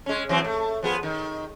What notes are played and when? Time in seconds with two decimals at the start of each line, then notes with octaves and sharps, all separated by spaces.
0.06 G#3 C#4
0.29 E3 F#3 C4
0.44 A3
0.83 F3 B3 G#4
1.03 D#3